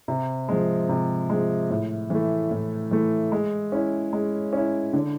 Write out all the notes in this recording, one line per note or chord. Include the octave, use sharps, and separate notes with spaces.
C3
F3 G#3
C3
F3 G#3
A2
E3 A3
A2
E3 A3
G#3
C#4 E4
G#3
C#4 E4
D3